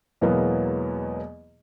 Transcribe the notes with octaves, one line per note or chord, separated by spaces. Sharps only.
E2 B2 F#3 G#3 A#3 B3